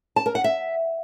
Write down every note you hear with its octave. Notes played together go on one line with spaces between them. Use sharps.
A5
A#4
F#5
E5